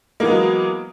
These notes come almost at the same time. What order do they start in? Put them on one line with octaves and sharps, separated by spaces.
A#3 E3 B3 G#3 F#3